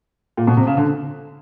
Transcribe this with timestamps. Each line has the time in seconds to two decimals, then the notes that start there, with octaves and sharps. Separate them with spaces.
0.37 A#2
0.47 B2
0.57 C3
0.67 C#3
0.77 D3